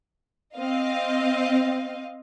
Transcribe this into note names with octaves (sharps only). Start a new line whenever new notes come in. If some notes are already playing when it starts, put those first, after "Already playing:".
C4 D#5 F5